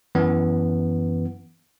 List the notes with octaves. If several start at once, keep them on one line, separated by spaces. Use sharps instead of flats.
F#2 E3 B3